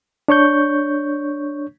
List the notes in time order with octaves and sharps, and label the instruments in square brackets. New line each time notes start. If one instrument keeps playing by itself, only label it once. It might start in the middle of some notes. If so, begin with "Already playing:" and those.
[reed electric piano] D4 C#5 C#6 G6